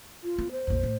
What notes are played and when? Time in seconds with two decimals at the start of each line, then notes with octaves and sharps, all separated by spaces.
0.23 F4
0.38 B3
0.51 C5
0.67 A#1 F2
0.83 A2